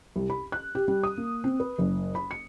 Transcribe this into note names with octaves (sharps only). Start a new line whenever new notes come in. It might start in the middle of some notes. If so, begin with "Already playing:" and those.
C2
B5
F#6
G4
G3
D#6
A#3
C4
B4
F#1
B5
C#7